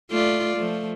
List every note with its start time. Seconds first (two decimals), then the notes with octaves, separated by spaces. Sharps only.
0.11 A3 F4 D5
0.56 F3 A3